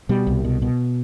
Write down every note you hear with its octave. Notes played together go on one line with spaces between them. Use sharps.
B2 G3
C2
B2
B2